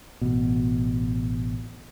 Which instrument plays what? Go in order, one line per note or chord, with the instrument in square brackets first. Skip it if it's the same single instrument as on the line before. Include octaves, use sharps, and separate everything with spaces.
[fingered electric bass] A1 B2